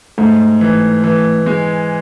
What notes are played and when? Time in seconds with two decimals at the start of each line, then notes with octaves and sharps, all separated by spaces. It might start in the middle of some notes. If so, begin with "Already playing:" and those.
0.18 G#2 A3
0.61 E3
1.04 E3
1.46 G#3